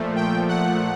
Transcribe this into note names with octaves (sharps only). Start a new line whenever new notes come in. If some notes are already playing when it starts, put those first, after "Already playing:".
Already playing: A#2 F3 A3
G5
F#5